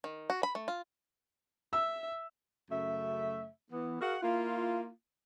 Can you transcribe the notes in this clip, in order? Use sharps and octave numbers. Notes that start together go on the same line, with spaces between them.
D#3
F#4
B5
A3
F4
E5 E6
F#2 C#3 A3 E5
E3 B3
F#4 G#4 A#4 F5 F#5
A#3 E4 F4